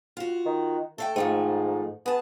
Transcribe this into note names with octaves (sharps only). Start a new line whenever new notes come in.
F4 F#4
D#3
A3 A4 F5 G5
G#2 D#3 F3 A3
B3 G#4 A5